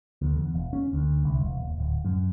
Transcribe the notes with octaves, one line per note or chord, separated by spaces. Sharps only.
D2
E2
E1
C#4
D2
C2
E1
D#1
D1
F#2